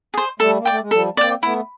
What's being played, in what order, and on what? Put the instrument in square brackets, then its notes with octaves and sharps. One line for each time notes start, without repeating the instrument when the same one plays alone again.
[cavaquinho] G#4 C5
[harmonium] G3 A3 [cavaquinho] A4
[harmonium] A#3
[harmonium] A3 [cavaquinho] D5 G5
[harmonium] G#3
[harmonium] F3 G3 [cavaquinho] A4
[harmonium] A#3 C4 [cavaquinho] D5 G5
[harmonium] A3 B3 [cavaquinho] E4